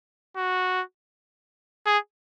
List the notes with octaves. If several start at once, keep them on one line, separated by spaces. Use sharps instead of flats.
F#4
G#4